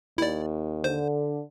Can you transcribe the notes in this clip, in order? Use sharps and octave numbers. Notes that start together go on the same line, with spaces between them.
D#2 E4 D5
D3 C5